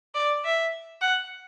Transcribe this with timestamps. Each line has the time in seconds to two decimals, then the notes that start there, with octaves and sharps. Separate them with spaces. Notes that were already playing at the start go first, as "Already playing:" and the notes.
0.15 D5
0.45 E5
1.01 F#5